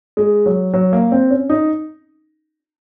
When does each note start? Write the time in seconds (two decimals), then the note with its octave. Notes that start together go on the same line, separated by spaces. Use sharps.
0.17 G#3
0.46 F#3
0.73 F#3
0.93 A#3
1.12 C4
1.31 C#4
1.49 D#4